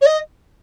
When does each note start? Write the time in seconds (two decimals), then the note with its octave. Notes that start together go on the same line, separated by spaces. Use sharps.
0.01 C#5
0.06 D#5